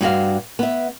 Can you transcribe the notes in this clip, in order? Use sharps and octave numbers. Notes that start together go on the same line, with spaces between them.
G2 F#4 F5
B3 E5